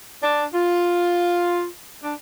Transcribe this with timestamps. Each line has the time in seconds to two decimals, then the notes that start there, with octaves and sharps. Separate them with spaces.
0.22 D4
0.54 F4
2.03 D4